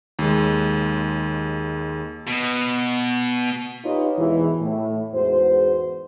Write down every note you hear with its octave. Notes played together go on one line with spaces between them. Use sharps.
D#2 G#3
B2
D#4 F4 G4 B4 C#5 D#5
E2 G#2 B2 E3
A2
E2 G#2 F#4 C5